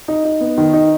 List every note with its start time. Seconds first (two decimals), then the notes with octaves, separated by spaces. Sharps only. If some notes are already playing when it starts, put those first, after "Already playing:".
0.08 D#4
0.25 D#4
0.41 B3
0.58 D#3
0.73 D#4